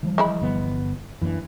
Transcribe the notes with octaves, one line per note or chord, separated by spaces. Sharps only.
E3 F3 G3
G#3 E4 B5
G1 B3
F#2 E3 A#3 D4